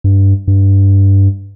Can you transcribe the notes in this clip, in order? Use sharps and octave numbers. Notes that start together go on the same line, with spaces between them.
G2
G2